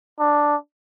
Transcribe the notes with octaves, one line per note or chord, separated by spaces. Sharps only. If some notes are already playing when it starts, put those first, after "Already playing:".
D4